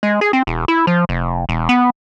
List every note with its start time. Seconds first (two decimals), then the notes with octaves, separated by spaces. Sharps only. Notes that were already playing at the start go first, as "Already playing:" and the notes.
0.03 G#3
0.21 G#4
0.33 C4
0.47 E1
0.68 E4
0.87 F3
1.09 F1
1.49 E1
1.69 B3